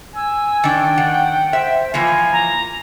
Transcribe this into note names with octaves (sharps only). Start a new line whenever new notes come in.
G#5 E6
D#3 D4 G5
D#3 F#5
C5 E5
E3 F3 A#3 G#5
A#5